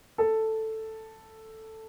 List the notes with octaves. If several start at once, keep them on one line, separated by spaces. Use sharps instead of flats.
A4